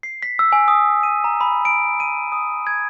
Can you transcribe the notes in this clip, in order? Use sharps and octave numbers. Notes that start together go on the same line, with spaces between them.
C7
B6
E6
G#5
D#6
D#7
A#5
B5
D7
D#7
D#6
G#6